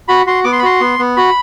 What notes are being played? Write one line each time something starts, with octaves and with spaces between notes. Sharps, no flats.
F#4 B5
F#4 C6
B3 D6
C6
B5
F#4 C6
B3
B3
F#4 B5